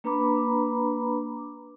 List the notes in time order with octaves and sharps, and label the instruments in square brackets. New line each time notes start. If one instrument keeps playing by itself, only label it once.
[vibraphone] A#3 D4 B4 A#5 B5 D6